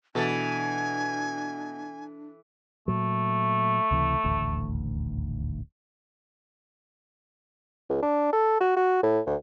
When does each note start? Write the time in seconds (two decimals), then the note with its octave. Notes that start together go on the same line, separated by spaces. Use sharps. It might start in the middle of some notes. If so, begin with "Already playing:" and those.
0.15 B2 E3 D4 A4 G#5
2.88 A#2 F#3 A3
3.91 C#2 C3 E3
4.24 D#1 A1 D2
7.89 C#2
8.02 D4
8.33 A4
8.61 F#4
8.76 F#4
9.03 A2
9.26 D2